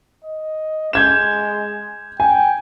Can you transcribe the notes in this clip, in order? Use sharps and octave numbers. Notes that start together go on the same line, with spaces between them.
D#5
G#3 G6 G#6 E7
G5 G#5